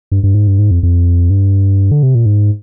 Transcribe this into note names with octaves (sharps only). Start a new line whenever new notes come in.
G2
G2
G#2
G2
G#2
F2
F2
G2
D3
C3
A#2
G#2